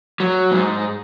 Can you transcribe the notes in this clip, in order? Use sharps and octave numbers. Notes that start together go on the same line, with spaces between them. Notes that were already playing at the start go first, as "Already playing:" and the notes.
F#3
G#2